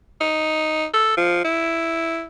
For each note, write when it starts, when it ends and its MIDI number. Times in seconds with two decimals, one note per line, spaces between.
0.21 0.86 63
0.94 1.13 69
1.17 1.40 53
1.45 2.25 64